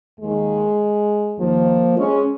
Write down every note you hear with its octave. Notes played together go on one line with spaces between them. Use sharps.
D#2 D#3 G#3
D#2 D#3 F3 A#3
G#3 C#4